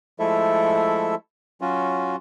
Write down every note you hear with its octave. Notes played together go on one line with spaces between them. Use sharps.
F3 G#3 A3 E4 A4 E5
F#3 C#4 F4 F#4